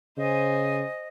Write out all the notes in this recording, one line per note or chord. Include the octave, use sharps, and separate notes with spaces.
C#3 C5 D#5 G#5